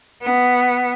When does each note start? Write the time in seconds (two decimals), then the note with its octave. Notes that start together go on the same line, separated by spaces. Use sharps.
0.23 B3